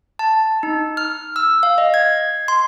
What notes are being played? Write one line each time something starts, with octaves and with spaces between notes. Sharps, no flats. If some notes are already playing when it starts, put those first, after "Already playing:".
A5
D#4
F6
E6
F5
D#5
G#6
C6